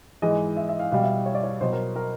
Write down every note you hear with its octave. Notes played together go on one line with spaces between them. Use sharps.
G#2 E3 G#3 D#5
E5
E5
F5
B2 G3 F5
E5
C#5
D5
C#5
B2 F#3 C5
A#4
A#4